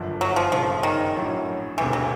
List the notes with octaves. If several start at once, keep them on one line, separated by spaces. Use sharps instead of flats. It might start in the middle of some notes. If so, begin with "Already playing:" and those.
Already playing: G1 F#2 D3 F3
F#3
F3
G1 F#2 C#3 F3
D#3
A#1 A2 F#3
E1 D2 C3 E3
F#3